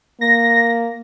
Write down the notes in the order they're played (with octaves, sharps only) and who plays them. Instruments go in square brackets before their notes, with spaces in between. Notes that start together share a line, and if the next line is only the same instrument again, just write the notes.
[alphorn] A#3 [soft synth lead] A#6